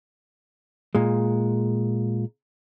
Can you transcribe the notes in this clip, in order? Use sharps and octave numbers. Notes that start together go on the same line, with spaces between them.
A#2 G#3